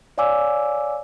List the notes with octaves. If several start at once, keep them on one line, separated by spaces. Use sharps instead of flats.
C#5 D5 F5 G#5 D6 E6